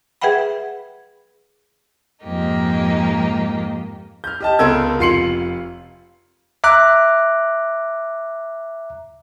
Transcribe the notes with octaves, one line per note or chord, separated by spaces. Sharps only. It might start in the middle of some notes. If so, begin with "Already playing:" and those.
G#4 B4 E5 F#5 G5 B5
F2 G#2 G#3 A#3 D#4 G4
F6 G6
G4 D#5 A5
C#2 B3 A4 A#4 E6 G#6
F1 F4 C6 C7 C#7 F#7
E5 A#5 D6 F#6